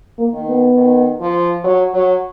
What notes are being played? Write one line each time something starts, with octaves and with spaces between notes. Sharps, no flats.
A#3
D#3
B3
D#3
F3
F#3
F#3